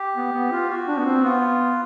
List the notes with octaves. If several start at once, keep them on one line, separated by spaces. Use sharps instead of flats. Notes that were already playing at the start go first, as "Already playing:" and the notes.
Already playing: G4
B3
B3
F4
F#4
D4
B3
C4
B3 F4